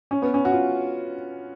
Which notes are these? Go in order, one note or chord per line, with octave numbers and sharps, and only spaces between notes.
C#4
B3
C#4
F#4
F4